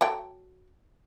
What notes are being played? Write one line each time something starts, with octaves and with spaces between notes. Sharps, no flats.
F#3 A4 G5